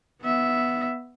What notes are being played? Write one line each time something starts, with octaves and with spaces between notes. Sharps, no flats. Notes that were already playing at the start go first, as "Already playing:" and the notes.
B3 E5